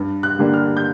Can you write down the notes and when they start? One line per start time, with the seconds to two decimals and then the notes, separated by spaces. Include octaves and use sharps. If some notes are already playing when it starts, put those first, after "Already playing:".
Already playing: G2
0.23 F#6
0.39 D3 G3 A#3 D4
0.54 F6
0.77 G6